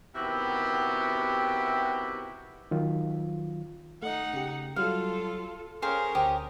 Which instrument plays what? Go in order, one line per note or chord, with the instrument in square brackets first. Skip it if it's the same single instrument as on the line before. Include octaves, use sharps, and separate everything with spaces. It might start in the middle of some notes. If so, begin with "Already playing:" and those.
[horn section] C3 D#3 B3 E4 F#4 G4
[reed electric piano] D#3 F#3 F4
[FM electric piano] A3 D#5 [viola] D#4 F#5
[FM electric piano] C#3 G4
[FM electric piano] F#3 G3 [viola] F4 A4 [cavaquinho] F5
[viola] C#4 A#4 [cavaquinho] G#4 C5 F5 [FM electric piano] G5
[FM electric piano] D2 C5 D#6 [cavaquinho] G4